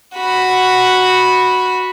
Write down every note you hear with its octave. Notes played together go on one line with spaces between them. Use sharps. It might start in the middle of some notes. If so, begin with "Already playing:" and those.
F#4 B5